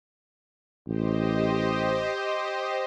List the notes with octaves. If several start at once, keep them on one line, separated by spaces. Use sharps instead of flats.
A1 G4 C5 D#5